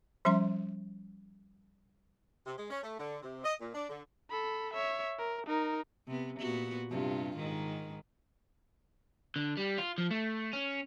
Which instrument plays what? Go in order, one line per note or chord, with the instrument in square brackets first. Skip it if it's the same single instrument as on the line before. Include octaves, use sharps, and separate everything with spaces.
[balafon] F3 G3 C#4 E5 C6
[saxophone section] C3
G#3
C#4
A3
D3
C3
D#5
A#2
D4
D3
[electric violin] A4 B5
C#5 E5
A#4
D#4 A#4
[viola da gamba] C3 B3
A#2 B3 F#4
G2 C3 F4
G#2 D#3
[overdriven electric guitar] D3
G3
F4
F3
A3
C#4